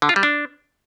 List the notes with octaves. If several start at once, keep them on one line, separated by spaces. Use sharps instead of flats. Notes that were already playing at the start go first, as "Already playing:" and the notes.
D3
F4
G3
D4